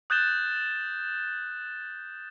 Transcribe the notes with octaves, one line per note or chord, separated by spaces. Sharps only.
D#6 F#6 G6 A6 E7 G7